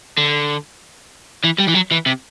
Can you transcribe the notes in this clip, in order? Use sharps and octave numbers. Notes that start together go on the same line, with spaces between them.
D3
E3
G3
E3
F#3
E3
C3